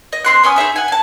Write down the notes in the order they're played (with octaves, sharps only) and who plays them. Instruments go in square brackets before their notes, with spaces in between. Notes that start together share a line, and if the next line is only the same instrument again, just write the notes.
[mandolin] D#5
C4 C6 F#6
B3 C#4 G#5 D#6
D#4 G#4 E5 B5
F#5 G#5
G#5 A5